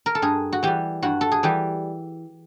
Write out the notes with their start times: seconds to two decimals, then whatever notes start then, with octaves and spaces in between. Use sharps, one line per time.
0.06 A#4
0.15 A4
0.22 G2 G#4
0.53 F#4
0.63 E3 G3 G4
1.03 G2 F#4
1.21 A4
1.32 G#4
1.43 E3 G3 G4